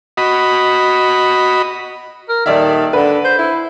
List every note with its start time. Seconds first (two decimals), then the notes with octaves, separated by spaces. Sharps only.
0.17 F#4 D#5 B5
2.29 A#4
2.46 D#1 D#3 D5 E5
2.93 D3 B4
3.25 C5
3.38 E4